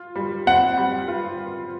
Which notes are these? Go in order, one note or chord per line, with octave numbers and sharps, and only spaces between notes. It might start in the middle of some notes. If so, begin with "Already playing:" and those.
Already playing: F4
G3
C4 F#5
G3
F4